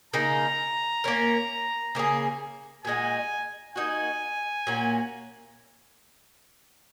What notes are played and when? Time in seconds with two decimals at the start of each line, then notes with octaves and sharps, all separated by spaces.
0.14 C#3 A#3 D#4 A#5
1.04 A#3 C#4 A#4
1.95 C#3 A#3 C#4 G#4
2.85 A#2 G#3 D#4 F#4 G#5
3.76 A#3 D#4 F#4 D#5 G#5
4.67 A#2 A#3 C#4 F#4